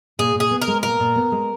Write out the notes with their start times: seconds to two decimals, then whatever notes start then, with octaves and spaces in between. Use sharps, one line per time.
0.19 A#2 G#4
0.35 A#2 G#4
0.51 B3
0.62 A#4
0.68 G#3
0.83 A#2 A#4
1.00 A#2
1.16 B3
1.32 G#3